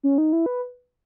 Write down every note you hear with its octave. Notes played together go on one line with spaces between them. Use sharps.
C#4
D#4
E4
B4